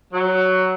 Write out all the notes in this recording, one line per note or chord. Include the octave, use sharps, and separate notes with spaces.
F#3